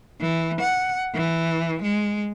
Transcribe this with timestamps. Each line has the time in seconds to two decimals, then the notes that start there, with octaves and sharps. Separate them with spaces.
0.21 E3
0.61 F#5
1.15 E3
1.82 G#3